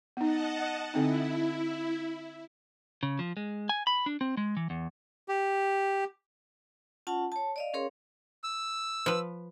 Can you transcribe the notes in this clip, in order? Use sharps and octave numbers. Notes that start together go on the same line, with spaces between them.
B3 D#4 D#5 F#5 A5
D3 C4 D#4 E4
C#3
F3
G#3
G#5
B5
D4
C4
G#3
E3
E2
G4
C#4 F4 F#5 A5
C#5 A5
D5 D#5 F5
C#4 G#4 A#4 C#5 F5 C6
E6
F3 B4